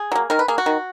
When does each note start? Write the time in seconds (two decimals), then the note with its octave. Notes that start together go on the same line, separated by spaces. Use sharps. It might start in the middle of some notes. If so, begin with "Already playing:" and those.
Already playing: G#4
0.12 F#3 A#3
0.30 D#3 A#4
0.39 B4
0.48 A#3 G#4
0.58 F#4
0.66 D#3